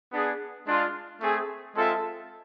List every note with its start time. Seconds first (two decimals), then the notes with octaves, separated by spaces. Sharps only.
0.11 B3 D4 G#4
0.65 G#3 D4 F4
1.20 A3 C4 G#4
1.74 G#3 C4 F4 A4 E5